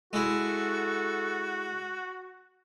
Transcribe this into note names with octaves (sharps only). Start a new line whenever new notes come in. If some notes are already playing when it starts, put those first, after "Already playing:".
G#3 E4 F#4 A4